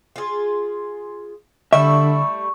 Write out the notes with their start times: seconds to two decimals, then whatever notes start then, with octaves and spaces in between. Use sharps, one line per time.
0.16 F4 G#4
1.73 D3 G3 A3 E4 E5 C#6